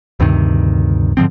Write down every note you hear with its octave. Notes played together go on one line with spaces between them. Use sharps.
D2 G2 C3 D#3
G#2 D3 F3 C4